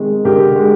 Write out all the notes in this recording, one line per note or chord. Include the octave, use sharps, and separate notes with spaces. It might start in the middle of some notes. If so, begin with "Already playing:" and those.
Already playing: C3 D#3 G#3
D3 G4 A#4
G#3